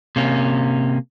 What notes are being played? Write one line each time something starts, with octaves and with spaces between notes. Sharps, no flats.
C3 A#3 C#4